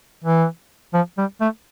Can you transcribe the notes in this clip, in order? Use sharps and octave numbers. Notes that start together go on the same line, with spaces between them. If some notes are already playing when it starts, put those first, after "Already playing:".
E3
F3
G3
A3